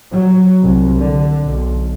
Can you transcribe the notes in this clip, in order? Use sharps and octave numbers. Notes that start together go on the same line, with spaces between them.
F#3
C2
D3
B1